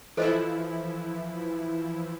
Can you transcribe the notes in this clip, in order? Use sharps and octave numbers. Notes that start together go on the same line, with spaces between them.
E3 F3 E4 A4 C5 D#5